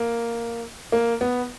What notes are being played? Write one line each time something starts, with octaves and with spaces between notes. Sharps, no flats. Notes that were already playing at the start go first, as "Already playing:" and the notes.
Already playing: A#3
A#3
B3